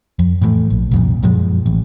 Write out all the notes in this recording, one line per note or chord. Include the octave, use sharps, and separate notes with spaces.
F2
A2 E3 F3 A3
A#1
C2 F2 A#2
F#2 A#2 F3 G#3
A1